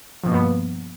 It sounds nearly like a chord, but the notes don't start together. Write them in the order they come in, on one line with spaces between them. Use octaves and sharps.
F3 B2 A#3 G2 B3